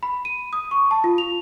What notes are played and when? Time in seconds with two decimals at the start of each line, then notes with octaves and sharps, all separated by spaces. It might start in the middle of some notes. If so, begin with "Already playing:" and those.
0.03 B5
0.25 D#7
0.53 D#6
0.71 C#6
0.91 A5
1.04 F4
1.18 F7